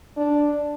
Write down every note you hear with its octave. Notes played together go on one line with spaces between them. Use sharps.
D4